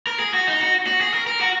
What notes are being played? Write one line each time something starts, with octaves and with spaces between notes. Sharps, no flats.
A#4
G#4
F#4
D#4
F#4
F#4
G#4
A#4
A#4
F#4